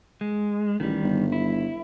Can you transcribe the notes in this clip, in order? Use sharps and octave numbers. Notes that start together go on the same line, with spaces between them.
G#3
A1 D#3 G3
G1
E4